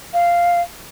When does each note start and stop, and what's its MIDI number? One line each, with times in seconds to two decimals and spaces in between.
0.14 0.62 77